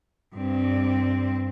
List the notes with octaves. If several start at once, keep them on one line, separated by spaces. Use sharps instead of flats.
G2 C4